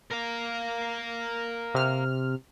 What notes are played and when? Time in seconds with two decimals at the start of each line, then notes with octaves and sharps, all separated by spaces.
0.11 A#4 F5
1.74 C3 F6